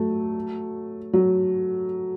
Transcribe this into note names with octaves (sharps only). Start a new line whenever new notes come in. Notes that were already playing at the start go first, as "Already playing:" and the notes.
Already playing: F#3 A3
F#3